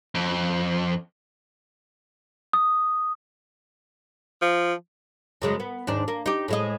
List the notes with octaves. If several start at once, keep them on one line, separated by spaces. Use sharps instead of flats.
F2
D#6
F3
F#2 C#3 G#3
B3
D#2 G#2 D4
A#3
D#4 G4
A2 G#3 D#5